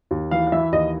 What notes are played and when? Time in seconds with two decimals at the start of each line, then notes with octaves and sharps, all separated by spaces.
0.11 D#2
0.31 E3 F5
0.47 F5
0.52 E3 E5
0.72 D#2 D#5